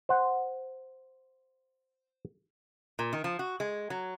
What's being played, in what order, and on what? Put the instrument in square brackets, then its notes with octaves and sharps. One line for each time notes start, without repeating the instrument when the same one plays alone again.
[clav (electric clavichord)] C5 F#5
[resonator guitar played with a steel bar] A#2
D#3
F3
F#4
G#3
F#3